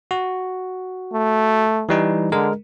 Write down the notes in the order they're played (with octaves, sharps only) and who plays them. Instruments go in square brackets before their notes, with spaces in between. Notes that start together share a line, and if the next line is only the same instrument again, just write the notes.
[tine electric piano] F#4
[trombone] A3
[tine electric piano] E3 G3 D#4
[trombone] D3 [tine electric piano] G#3 A#4